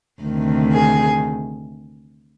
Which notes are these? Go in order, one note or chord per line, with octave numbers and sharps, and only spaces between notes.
D2 C3 D#3
G#4